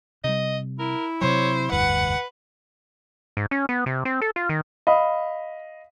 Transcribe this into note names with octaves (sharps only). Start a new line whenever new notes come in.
C3 G3 D#5
E4 A#4
C3 F#3 C5 C#5
F1 D2 G2 B4 F#5
G#2
C#4
B3
C3
C4
A4
F4
D#3
D#5 F5 B5